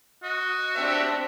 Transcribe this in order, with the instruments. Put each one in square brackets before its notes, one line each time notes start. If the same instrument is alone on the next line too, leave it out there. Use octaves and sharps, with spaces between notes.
[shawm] F#4 [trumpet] D#5
[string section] C4 D4 G4 [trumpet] E5